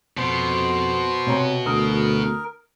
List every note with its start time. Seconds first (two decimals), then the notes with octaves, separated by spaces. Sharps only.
0.18 F2 B2 C5
1.27 C3 C#5 A#5
1.66 D2 A#4 D#6